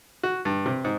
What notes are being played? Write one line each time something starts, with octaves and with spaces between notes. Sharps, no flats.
F#4
G2
C3
G#2